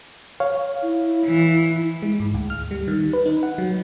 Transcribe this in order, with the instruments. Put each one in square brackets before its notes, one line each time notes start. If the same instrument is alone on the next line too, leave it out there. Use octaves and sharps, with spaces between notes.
[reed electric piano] C#5 F5
[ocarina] E4
[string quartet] E3
[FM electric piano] G#3
G#2
D2
F6
G3
D#3
B4
D#4
F#5
F#3